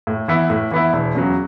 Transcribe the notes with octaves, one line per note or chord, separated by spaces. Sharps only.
A2
E3 B3 E4
A2
E3 B3 E4
E1
E2 C#3 F#3